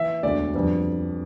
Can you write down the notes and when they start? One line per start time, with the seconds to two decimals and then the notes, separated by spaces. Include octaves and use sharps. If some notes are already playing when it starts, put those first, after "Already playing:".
Already playing: E3 E5
0.23 E1 D2 D3 D5
0.54 F2 D3 G3 B3 D4